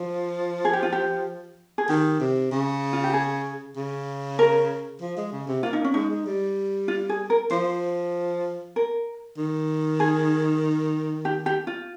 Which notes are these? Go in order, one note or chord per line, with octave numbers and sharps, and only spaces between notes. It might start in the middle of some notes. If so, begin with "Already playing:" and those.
Already playing: F3
G#4
G4
F4
G4
G#4
D#3 G4
C3
C#3
F4
G4
G#4
C#3
A#4
F3
G#3
C#3
C3
A#3 F4
D#4
C#4
G#3 D#4
G#3
G3
F4
G#4
A#4
F3 C5
A#4
D#3
G#4
G4
G4
F4